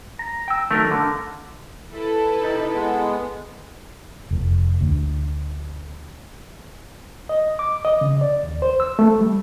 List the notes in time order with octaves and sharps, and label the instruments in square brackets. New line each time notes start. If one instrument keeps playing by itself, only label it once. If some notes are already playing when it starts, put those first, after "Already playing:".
[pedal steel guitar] A#5
G5 E6
[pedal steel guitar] D#3 F#3 [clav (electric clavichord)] A3 A#4
[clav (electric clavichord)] D3 [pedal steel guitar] A3 A#4
[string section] E4 A4 B4
[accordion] C3 D#4
G#3 B3
[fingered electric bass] F1
D2
[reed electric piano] D#5
D6
D#5
C#3
D5
D#2
C5
E6
A3
G3